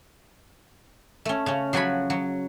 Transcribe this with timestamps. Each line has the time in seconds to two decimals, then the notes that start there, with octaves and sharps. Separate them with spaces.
1.25 A3 C#4
1.46 C#3 C#4
1.73 F3 F#3 F#4 F#5 G#5 B5
2.10 F#3